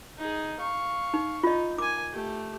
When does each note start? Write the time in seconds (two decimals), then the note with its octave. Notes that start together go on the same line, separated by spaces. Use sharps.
0.18 D#4 G#4
0.60 F5 C#6
1.14 D#4
1.43 D#4 F4 D#5
1.78 A#4 G#5 D6
2.13 A3 G4